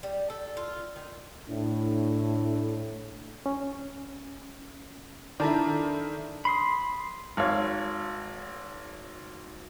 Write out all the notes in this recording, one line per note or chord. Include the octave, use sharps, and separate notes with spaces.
G3
A4
F4
D#3
A2 D4
C#4
D#3 D4 E4 A4 D5 A5 A#5
B5 C6 D#6
G#1 C#5 F5